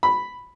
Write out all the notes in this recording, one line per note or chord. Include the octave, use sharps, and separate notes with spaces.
B5